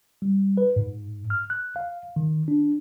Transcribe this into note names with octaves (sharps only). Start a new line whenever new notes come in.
G3
B4
G#2
F6
F#6
F5
D#3
D4